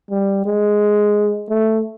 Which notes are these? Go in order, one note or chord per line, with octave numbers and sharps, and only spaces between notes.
G3
G#3
A3